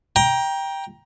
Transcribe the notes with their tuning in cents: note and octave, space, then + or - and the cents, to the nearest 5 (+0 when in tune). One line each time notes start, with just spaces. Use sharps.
G5 +5 A#5 +20